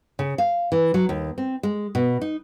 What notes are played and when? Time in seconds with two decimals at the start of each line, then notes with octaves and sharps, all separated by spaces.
0.19 C#3
0.38 F5
0.72 E3
0.94 F#3
1.09 D#2
1.38 C4
1.63 G#3
1.95 B2
2.21 D#4